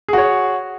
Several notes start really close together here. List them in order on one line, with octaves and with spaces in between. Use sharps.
G#4 F#4 C#5